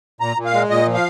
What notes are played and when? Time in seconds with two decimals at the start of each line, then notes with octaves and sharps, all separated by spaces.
0.21 A#2 A#5
0.37 A#2
0.45 F5
0.54 G#3
0.69 A#2 D#5
0.86 F3
0.94 F5